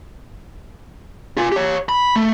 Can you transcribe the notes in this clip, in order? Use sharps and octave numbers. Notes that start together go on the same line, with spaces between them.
F4 G#5
G4 C#5
B5
A3